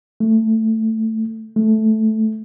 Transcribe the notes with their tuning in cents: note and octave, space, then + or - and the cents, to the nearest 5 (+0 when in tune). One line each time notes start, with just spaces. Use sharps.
A3 +10
A3 -10